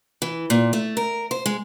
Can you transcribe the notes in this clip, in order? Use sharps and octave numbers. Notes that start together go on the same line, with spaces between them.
E3
A#2
A3
A#4
C5
G#3